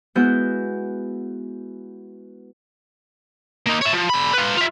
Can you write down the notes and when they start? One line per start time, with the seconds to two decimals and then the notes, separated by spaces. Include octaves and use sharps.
0.15 G#3 B3 E4 F#4 G6
3.67 A#3 D#4
3.82 C#5 E5
3.94 F3
4.10 D3 B5
4.34 F4 B4
4.57 F4 E5